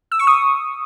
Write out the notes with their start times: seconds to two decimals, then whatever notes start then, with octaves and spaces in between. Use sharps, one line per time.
0.12 E6
0.19 C#6
0.27 D#6